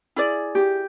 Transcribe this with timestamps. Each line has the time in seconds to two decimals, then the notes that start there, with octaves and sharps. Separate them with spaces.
0.16 E4 G#4 D5
0.55 G4